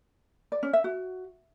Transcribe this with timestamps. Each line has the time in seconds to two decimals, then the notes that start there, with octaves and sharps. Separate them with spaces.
0.52 D5
0.63 C#4
0.73 E5
0.84 F#4